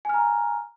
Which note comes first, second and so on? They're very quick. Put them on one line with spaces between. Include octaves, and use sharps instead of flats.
G#5 F6 A#5